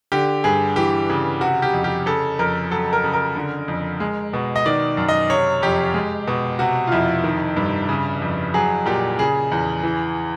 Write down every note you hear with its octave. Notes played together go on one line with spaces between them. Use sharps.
D3 G4
G2 G#4
E3 G4
C#3
C3 F#4
G4
F2
G4
C#3 A4
F2 A#4
F#3 A4
A#4
C#3
A#4
D3
F2
G#3
B2
D#5
D#3 D5
F#2
D#5
C3 C#5
F2 G4
G#3
B2
C3 F#4
F4
F2 E4
D#3
G2
C#3
F2
F#3 G#4
A#2 G4
C#3 G#4
E2
E3